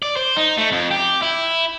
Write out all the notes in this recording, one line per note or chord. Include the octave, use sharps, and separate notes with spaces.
D5
C5
D#4
A3
F2
G4
E4